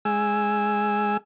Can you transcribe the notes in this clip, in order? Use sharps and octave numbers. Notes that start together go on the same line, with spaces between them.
G#3 G#5 E6